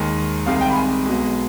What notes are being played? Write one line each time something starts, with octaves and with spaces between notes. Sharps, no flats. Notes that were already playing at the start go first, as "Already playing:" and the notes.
Already playing: D#2 D#3 G#3
C2 C3 D#3 G#3 F5
G5
B5
G#5
B1 B2 G#3